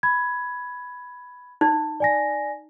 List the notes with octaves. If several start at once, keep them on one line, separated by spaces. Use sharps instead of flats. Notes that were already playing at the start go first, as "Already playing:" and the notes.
B5 G#6
D#4
D5 G#5 A#6